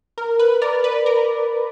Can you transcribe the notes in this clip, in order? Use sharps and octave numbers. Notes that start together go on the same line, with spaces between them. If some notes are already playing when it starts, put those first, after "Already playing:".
A#4
B4
A#4 D5
B4
A#4